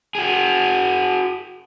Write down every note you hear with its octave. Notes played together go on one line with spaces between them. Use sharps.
F#4 G#4